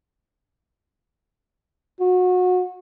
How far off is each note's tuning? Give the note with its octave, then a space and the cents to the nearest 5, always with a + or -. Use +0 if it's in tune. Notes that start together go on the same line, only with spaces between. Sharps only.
F#4 -25